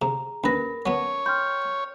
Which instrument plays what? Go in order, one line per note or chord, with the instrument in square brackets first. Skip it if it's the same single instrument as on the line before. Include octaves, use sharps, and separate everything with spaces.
[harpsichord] C3 [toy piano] G#4 [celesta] A#5
[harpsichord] D#2 B4 [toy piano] C#4 A#4 [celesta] B5 A#6
[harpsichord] F#3 B3 [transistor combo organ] C#5 [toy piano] A5
[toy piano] G5 C6 [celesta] F6 G6